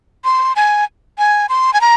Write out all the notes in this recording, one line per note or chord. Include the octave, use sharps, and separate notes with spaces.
C6
G#5
G#5
C6
G#5
A#5